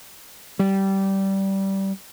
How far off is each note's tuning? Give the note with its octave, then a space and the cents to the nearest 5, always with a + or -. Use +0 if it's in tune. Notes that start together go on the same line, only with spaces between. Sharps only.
G3 -15